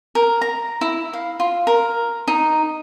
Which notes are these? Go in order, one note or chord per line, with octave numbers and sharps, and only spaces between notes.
A#4
A#5
E4
F5
F4
A#4
D#4